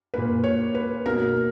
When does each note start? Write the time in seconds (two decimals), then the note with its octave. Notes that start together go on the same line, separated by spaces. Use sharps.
0.14 A#2 A#3 B4
0.44 C#5
0.75 B4
1.05 B2 A#3 A#4